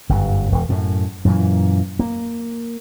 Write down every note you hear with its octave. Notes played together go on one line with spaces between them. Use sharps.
G1 F#2
E1
F#2 A2
F#2 A#2 E3
A#3